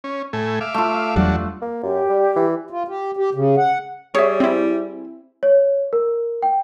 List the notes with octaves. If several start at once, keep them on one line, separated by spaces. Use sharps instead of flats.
C#4
A2 A3 G#5
E5 F5 D6
A3 F4
E2 F#3 G3 D4 F#4
A#3
F#2 G4
G3
E3
F4
G4
G4
C#3
F#5
G3 G#4 C#5 E5
C4 E4
C#5
A#4
G5